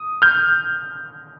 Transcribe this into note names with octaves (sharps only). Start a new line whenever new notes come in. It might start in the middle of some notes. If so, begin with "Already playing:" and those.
Already playing: D#6
F6 G6